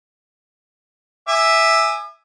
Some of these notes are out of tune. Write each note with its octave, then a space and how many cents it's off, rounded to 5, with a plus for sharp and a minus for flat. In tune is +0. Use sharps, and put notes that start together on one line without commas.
E5 +0 G#5 +0 D6 +45